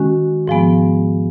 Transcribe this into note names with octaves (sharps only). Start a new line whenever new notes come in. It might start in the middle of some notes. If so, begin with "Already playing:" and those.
Already playing: D#3 G#3 C#4 F#4
G#2 F3 G#3 B3